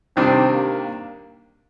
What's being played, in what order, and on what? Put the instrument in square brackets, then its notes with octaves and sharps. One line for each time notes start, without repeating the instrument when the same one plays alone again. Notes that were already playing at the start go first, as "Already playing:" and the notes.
[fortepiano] C3 D#3 G3 D4 [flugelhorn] C4
[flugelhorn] A#3